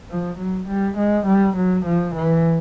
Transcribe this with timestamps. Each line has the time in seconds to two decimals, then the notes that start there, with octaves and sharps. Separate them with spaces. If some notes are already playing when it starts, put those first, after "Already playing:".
0.10 F3
0.39 F#3
0.68 G3
0.98 G#3
1.27 G3
1.57 F#3
1.86 F3
2.15 E3